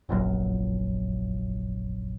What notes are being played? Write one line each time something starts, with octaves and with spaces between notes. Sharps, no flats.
F1 A#1 F#2